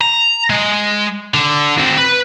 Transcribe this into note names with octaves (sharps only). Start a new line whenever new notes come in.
A#5
G#3
D3
C4 F#4
B4